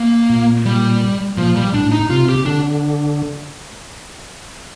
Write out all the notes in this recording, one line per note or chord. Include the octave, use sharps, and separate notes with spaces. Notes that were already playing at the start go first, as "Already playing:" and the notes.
Already playing: A#3
A#2
G3
A#2 F3
G3
A2 D4
D#4
C3 F4
G4
D3 D4